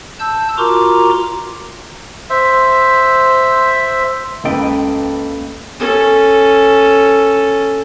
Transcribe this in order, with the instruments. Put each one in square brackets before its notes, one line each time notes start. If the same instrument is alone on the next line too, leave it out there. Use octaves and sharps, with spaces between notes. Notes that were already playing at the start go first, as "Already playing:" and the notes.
[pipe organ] A5 E6 G6
F4 F#4 A#4 A#5 C6 D6
[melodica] C5 E5
[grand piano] C#2 [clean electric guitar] A#3 A4 G5 [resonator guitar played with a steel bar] B4 D#5
[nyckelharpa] C#4 A4